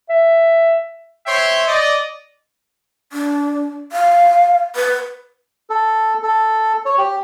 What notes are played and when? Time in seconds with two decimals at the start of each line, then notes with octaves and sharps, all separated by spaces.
0.09 E5
1.26 C5 C#5 E5 G5 C6
1.68 D5 D#5
3.13 D4
3.92 F5
4.76 B4
5.70 A4
6.22 A4
6.86 C#5
6.98 G4